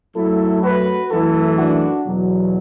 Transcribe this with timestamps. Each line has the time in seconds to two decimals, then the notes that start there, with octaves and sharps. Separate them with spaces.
0.16 F#2 F#3 A3 E4 A4
0.63 F#4 B4
1.11 F#2 E3 A3 E4 A4
1.58 D4 F#4
2.06 E2 B2 F#3